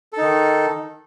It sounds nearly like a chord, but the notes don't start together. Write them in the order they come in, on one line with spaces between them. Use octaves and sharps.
A4 D#4 D#3